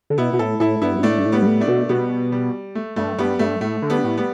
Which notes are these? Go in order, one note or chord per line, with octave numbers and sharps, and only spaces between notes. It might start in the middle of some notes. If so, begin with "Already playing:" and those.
D3
B2 B3 E4
B2
A2 E4 A4
A2 E4 A4
G2 B3 E4
G2
A2 A3 D4
G2
A2
G3 B3
G2
A2
A3 D4
B2
B2 G3 B3
G3
A3
G2 A3
G2 G3 B3
G2 A3
A2 A3
D3
G3 B3
A2
G3 B3